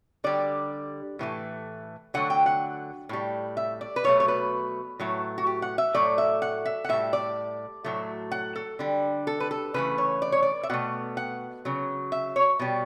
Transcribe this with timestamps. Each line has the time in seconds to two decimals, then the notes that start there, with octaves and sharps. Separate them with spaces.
0.24 D3 G3 D5
1.19 A2 E3 A3
2.14 D3 F#3 A3 F#5
2.30 G5
2.46 F#5
3.09 A2 G3
3.57 E5
3.81 D5
3.96 B4
4.04 B2 F#3 A3 C#5
4.20 C#5
4.28 B4
5.00 A2 F#3 A3
5.38 F#4
5.47 G4
5.62 F#5
5.78 E5
5.95 A2 F#3 A3 D5
6.18 E5
6.42 F#5
6.66 E5
6.84 F#5
6.89 A2 G3 E5
7.13 D5
7.84 A2 F#3 A3
8.32 F#5
8.56 A4
8.79 D3 G3
9.27 A4
9.40 B4
9.51 A4
9.74 C#3 E3 A3 B4
9.98 C#5
10.22 D5
10.32 C#5
10.43 D5
10.63 E5
10.70 B2 A3 F#5
11.17 F#5
11.65 C#3 F#3
12.12 E5
12.36 C#5
12.60 B2 G3